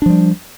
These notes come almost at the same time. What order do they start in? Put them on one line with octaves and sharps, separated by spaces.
D4 F3 G3